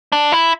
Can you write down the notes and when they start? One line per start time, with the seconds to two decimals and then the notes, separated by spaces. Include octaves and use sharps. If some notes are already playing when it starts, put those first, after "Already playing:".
0.12 D4
0.32 E4